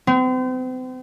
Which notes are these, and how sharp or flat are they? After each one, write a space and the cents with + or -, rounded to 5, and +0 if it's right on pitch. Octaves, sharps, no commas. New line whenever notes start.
C4 -40